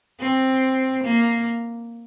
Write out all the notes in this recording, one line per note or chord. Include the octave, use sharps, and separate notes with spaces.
C4
A#3